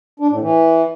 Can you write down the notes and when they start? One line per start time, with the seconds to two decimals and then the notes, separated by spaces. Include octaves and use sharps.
0.20 D4
0.30 A2
0.41 E3